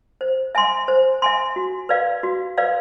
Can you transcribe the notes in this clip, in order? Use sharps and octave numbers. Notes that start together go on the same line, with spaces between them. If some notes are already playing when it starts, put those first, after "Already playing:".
C5
E5 G#5 C6
C5
E5 G#5 C6
F#4
B4 D5 F5
F#4
B4 D5 F5